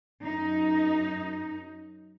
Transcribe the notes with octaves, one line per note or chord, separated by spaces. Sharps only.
F#2 D#4